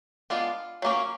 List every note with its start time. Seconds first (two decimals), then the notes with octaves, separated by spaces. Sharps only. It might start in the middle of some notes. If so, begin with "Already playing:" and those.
0.30 G#3 B3 D4 F4
0.82 F#3 A#3 C#4